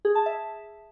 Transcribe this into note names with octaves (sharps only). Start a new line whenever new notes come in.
G#4
A5
E5